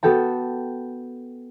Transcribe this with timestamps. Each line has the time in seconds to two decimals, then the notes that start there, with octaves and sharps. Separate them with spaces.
0.03 B3 F#4 A4 G5 A5